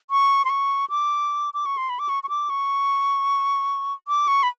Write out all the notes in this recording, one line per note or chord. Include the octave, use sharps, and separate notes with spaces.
C#6
C6
C#6
D6
D6
C#6
C6
B5
D6
C#6
C#6
D6
C#6
D6
C#6
B5